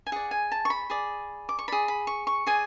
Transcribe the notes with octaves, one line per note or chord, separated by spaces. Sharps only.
G#5
G#4 D5 F#5
G#5
A5
C#6
B5
G#4 D5
D6
C#6
G#4 D5 B5
B5
C#6
C#6
G#4 D5 G#5